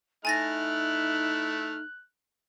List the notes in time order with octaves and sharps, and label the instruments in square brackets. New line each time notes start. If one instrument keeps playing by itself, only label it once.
[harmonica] A3 E4 F6 [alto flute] D#4 [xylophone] G#5 A6 A#6 [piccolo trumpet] F#6